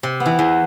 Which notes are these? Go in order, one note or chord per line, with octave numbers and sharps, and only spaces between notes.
C3
B3
E3
E2